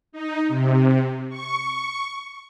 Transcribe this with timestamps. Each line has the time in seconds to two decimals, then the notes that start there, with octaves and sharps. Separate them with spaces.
0.12 D#4
0.48 C3
1.30 C#6